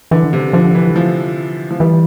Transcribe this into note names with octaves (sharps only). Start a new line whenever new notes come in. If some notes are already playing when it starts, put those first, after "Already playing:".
D3 E3
C3
D3 F3
E3
F3
F3
E3 G3